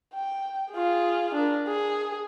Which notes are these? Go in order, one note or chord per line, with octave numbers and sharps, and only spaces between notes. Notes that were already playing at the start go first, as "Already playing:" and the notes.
G5
F4 G#4
D4 A#4
G#4